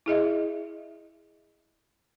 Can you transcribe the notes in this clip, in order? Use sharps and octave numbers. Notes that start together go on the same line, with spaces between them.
E4 G#4 D#5 E5